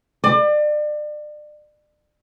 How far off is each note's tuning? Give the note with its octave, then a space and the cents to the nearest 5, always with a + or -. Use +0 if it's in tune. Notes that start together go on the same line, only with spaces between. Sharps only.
D5 +35